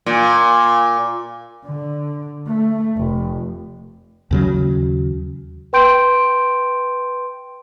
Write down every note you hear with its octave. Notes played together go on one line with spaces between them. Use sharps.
A#2
D3
A3
F1
D#2 C#3 F#3
B4 G5 C6 G6 D7